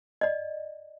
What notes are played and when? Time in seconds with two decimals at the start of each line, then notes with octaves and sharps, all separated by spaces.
0.21 D5 D#5